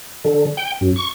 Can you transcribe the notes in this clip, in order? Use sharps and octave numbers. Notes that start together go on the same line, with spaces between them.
D3
G5
F#2
C#6